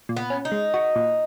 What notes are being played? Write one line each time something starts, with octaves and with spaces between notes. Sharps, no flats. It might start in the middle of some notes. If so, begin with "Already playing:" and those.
A#2
B3
C#4
D#4
G#3
F#4
A#2